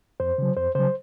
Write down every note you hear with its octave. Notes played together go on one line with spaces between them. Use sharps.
F2 C5
C#3 F#3
F2 C5
C#3 F#3 C5